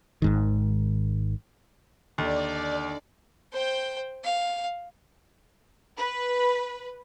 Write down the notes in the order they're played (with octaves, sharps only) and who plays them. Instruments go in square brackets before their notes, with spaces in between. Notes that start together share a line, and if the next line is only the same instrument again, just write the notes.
[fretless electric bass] G#1 G#2 D#3
[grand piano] D#2 [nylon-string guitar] D3 D#3 [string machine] D5
[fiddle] C5 G5
F5
[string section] B4